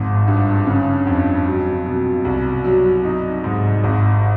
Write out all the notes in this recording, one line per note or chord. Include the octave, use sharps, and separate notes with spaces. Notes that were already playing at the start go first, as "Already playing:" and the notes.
Already playing: G#1 G#2 F3
G2
C#3
F2
F#3
B2
C2
F#3
D#4
G#2
G#1